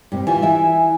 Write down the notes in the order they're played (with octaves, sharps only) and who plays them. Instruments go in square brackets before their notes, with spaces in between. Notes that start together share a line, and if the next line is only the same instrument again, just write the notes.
[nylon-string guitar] G2 C3
[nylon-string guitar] E3 G3 F4 [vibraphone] G#5
[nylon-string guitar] E3 E4 E5